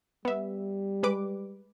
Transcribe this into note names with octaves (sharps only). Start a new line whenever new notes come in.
G3 B3 E5
G#3 B4 D6